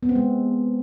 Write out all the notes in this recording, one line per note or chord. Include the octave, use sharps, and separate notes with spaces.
B3
C4
G#3